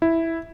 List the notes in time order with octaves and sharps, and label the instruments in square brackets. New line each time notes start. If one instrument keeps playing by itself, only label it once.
[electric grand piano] E4